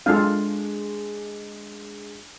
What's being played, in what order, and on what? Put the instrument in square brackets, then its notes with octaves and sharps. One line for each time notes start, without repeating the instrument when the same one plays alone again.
[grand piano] G#3 D4 [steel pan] F4 A4 F5